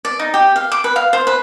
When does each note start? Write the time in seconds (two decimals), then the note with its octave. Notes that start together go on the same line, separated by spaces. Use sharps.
0.05 D5
0.19 D#4
0.34 G4
0.56 F5
0.72 D6
0.84 B4
0.96 F5
1.13 C5
1.27 B4